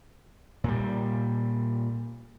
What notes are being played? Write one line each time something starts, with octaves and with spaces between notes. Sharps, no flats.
A#2 G3